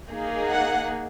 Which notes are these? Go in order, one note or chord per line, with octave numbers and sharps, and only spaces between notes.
A#3 D#4 G#4
F#5